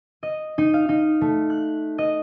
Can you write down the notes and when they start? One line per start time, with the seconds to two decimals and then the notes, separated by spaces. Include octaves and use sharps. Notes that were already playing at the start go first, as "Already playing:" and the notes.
0.23 D#5
0.58 D#4
0.74 F5
0.89 D#4
1.21 A3
1.50 F#6
1.98 D#5